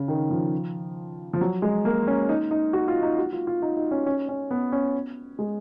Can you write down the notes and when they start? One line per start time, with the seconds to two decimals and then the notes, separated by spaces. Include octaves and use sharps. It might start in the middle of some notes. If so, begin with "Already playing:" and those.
Already playing: C#3
0.08 D#3
0.30 F3
1.33 F3
1.41 F#3
1.62 G#3
1.85 A#3
2.07 C#4
2.29 D#4
2.51 D#4
2.73 F#4
2.88 F4
3.02 D#4
3.18 F#4
3.33 F4
3.47 F4
3.62 D#4
3.76 D#4
3.91 C#4
4.06 C#4
4.29 C#4
4.51 B3
4.72 C#4
5.39 G#3